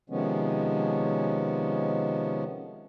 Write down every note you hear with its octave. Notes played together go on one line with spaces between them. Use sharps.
C3 D#3 F3 G#3 B3 C#4